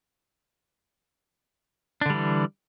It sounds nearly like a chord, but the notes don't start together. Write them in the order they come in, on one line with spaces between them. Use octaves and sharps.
D4 D3 G3 E3